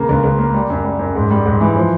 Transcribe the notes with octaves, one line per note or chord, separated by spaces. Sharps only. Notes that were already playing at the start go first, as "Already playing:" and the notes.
Already playing: C#3 A#3
C#2
C#2
A#3
G3
F#2
G3
F#2
G#2
G3
G#2
E3
F3